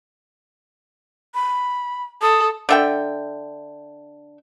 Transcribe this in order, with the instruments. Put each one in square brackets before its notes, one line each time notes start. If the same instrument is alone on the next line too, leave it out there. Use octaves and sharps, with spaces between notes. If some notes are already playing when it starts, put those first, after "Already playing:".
[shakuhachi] B5
[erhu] A4 [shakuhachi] D#6
[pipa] D3 E5 G5